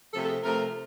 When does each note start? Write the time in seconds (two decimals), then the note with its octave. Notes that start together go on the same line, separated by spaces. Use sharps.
0.14 C3 F3 A3 A4
0.24 A4
0.28 G#4
0.42 C3 F3 A3 A#4